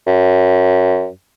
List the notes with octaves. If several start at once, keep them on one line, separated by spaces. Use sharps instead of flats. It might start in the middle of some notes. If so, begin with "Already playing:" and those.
F#2